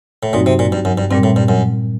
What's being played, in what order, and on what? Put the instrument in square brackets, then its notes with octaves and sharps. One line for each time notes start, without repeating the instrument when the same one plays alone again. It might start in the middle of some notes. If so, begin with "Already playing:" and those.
[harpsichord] A2
[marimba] G2 F#3 C4 D#4 F#4 [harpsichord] A#2
[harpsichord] C3
A#2
G2
F#2
G2
[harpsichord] G2 [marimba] A#2 G3 C4
[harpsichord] A2
G2
F#2